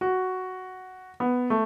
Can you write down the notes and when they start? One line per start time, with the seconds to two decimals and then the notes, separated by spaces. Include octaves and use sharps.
0.01 F#4
1.20 B3
1.50 A3